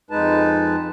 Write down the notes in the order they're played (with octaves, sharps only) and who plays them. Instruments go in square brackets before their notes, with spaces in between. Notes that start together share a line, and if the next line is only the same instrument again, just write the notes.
[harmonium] F2 G#3 D#4 B4 A5